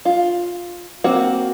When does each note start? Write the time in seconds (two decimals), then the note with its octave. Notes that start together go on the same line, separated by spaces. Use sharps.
0.05 F4
1.04 A#3 C4 F#4